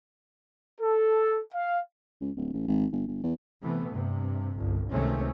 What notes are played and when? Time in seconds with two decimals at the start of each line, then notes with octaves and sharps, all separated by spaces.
0.81 A4
1.55 F5
2.21 C#2
2.36 D1
2.54 A1
2.68 G#1
2.92 G1
3.07 G1
3.23 E2
3.62 C3 E3 A3 B3
3.91 G2 C3
4.55 G1 C2
4.90 C#2 C3 D#3 A3 C4 C#4